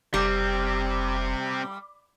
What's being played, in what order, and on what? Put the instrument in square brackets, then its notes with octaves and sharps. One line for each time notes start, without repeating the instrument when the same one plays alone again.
[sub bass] F1 [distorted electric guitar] C3 C4 [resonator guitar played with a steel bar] G3